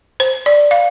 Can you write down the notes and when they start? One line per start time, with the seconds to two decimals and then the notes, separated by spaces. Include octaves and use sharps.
0.20 C5
0.46 D5
0.71 F5